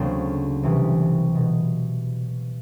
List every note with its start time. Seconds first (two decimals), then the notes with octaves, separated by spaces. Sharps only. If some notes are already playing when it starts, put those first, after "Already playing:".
Already playing: D2 C#3 F#3 A#3 C4 C5
0.63 C2 C3 E3
1.35 B2